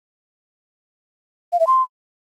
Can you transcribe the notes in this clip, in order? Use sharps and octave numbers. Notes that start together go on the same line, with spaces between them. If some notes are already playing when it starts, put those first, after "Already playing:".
F5
E5
C6